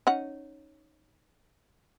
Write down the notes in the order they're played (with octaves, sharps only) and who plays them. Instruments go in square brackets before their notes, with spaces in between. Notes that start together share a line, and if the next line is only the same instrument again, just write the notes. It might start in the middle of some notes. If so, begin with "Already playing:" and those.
[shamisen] C#4 D#4 F#5